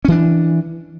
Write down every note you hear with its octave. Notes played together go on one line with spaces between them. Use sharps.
E3 C#4 D4